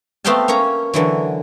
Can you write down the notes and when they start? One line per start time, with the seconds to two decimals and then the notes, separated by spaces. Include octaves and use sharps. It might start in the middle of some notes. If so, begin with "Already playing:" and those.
0.24 A3 B3 C4 F5 G5 A5
0.48 A#3 C#4 C#5 A#5
0.94 D3 E3 F#3